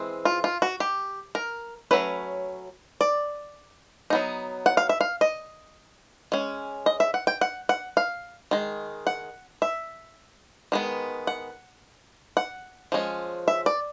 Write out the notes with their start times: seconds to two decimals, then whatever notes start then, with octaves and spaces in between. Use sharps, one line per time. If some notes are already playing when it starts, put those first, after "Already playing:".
Already playing: E3 G#3 C4
0.25 F4
0.44 F4
0.62 F#4
0.80 G4
1.35 A#4
1.91 F#3 A3 C#4 B4
3.01 D5
4.10 F#3 B3 D#4
4.66 F#5
4.77 F5
4.89 E5
5.01 F5
5.21 D#5
6.32 G#3 C#4
6.86 D#5
7.00 E5
7.14 F#5
7.27 G5
7.41 F#5
7.69 F#5
7.97 F5
8.51 D#3 G#3
9.07 F#5
9.62 E5
10.72 D#3 G#3 B3
11.27 F#5
12.37 F#5
12.92 F3 G#3 C#4
13.48 E5
13.66 D5